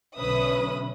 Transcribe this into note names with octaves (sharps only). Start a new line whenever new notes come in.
B1 D3 C#4 B4 E5 D#6